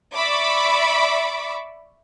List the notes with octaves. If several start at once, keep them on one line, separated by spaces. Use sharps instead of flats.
D5 E5 B5 C#6 D6